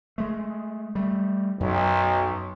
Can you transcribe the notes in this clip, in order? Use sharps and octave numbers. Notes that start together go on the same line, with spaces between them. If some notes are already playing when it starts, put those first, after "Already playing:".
G#3 A3
G3 A3
B1 F#2